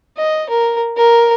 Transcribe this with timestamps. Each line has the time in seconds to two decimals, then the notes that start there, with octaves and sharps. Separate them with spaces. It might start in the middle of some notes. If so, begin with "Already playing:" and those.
0.17 D#5
0.50 A#4
0.97 A#4